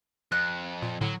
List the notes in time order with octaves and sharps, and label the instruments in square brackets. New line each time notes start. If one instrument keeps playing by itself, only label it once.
[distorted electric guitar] F2 [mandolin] F#6
[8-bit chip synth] A#2
[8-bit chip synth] A2 D3 [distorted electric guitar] F#3